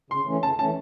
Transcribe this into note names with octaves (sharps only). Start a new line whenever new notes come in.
C#3 C6
E3 A3 C#4
C#3 A5
E3 A3 C#4 A5